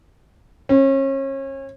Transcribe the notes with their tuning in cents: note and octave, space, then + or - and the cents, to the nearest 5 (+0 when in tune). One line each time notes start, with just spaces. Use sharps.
C#4 -35